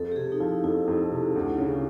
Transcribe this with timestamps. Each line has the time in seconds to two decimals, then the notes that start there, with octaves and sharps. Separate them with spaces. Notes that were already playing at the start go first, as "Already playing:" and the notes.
Already playing: F2 A4
0.12 G4
0.16 C3 G#4
0.32 D#4
0.40 F3 E4
0.64 F2 E4
0.88 F2
1.11 C3
1.36 D2
1.58 C#3